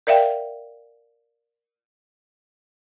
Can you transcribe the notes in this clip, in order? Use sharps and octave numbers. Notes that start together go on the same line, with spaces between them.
A#4 D5 E5 F5 G5